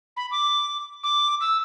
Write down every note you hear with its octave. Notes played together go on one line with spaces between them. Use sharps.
B5
D6
D6
E6